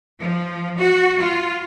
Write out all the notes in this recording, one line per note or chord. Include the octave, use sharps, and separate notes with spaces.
F3
F#4
F4